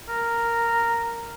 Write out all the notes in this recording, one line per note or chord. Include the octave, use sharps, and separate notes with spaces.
A#4